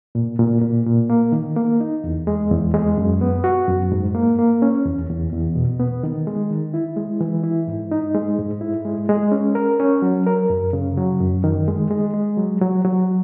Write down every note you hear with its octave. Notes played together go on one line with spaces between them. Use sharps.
A#2
A#2
A#2
A#2
A#3
D#3
A#3
D#4
E2
G#3
E2
G#3
F#2
B3
F#4
F#2
G#2
A#3
A#3
C#4
E2
E2
E2
B2
B3
D#3
G#3
D#3
E4
G#3
E3
E4
G#2
D#4
G#3
G#2
E4
G#3
G#3
C#4
A#4
C#4
F#3
A#4
F#2
C#3
F#3
F#2
D#3
G#3
G#3
G#3
F#3
F#3
F#3